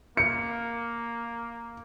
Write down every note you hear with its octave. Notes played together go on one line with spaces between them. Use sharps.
A#3 C#7